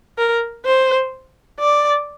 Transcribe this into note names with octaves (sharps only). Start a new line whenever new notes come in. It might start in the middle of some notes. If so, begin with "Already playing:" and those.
A#4
C5
D5